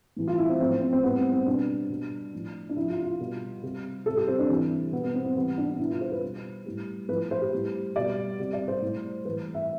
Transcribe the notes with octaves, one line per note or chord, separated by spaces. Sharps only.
A2 E3 G3
F4
E4
C4
A2 F3 C4
C4
C4
C4
A2 G3 B3
C4
C4
B2 G3 D4
B2 G3
A2 F3
D4
C3 F3 E4
F4
F4
B2 G3
C3 G3
C3 G3 A4
G4
C4
D4
C3 E3 G3
B2 G3 B3
B3
C4
C4
C3 E3 G3 B3
D4
D4
B2 G3 E4
F4
C5
B4
B2 G3
A2 G3
A2 F3 B4
C5
G4
A2 G3
B2 G3 D5
C3 G3
D5
C5
A2 G3
A2 E3 G3 B4
E5